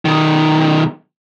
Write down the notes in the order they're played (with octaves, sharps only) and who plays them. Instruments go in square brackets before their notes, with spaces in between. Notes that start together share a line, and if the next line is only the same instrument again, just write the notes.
[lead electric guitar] B1 D#3